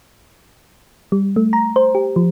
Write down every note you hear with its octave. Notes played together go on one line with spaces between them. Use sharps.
G3
A3
A#5
C5
G4
F3